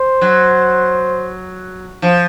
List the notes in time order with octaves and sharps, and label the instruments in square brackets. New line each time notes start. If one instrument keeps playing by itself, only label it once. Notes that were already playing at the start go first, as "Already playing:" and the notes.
Already playing: [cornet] C5
[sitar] F#3
F3